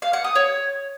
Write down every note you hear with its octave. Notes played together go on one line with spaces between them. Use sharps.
F5
F#5
D#6
C#5